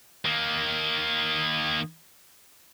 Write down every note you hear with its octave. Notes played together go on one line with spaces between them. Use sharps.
D#3 A#3